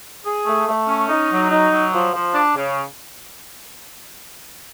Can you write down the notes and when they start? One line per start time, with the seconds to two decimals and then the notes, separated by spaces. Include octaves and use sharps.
0.24 G#4
0.46 A3
0.67 A3
0.87 C#4
1.09 D#4
1.30 F#3
1.50 D#4
1.71 F#3
1.93 F3
2.13 F3
2.34 D4
2.56 C#3